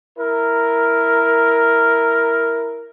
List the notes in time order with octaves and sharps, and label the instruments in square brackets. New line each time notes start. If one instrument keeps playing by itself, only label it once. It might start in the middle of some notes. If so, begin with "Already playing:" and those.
[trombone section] E4 A#4